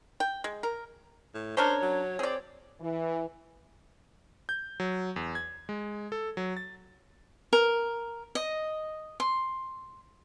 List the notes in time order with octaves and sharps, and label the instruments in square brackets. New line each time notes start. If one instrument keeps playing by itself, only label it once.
[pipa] G5
G#3
A#4
[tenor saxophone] A2
[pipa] C#4 D4 A#4 [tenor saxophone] C5 [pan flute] C#5
[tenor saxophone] F#3
[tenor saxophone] C4 [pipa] G#4 D5
[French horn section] E3
[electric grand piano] G6
F#3
E2
G#6
G#3
A4
F#3
A6
[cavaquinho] A#4
D#5
C6